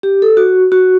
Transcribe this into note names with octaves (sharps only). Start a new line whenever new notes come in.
G4
A4
F#4
F#4